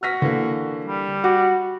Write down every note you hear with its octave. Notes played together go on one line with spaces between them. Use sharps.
F#4 F6 A#6 B6
D3 E3 A#3
G3
F#4 D6